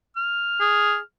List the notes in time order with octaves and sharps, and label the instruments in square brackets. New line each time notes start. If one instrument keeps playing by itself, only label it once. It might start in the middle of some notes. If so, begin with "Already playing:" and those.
[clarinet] F6
[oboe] G#4